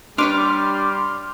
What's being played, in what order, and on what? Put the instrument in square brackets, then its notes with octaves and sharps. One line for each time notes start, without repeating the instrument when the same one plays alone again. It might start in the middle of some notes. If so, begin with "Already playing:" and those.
[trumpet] G3 [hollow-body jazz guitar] D4 B4 C#5 [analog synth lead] C6 [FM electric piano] D6 F6